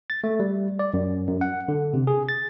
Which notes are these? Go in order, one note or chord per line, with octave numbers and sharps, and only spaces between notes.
A6
A3
G3
D5
F#2
F#2
F#5
D3
C3
G#4
A6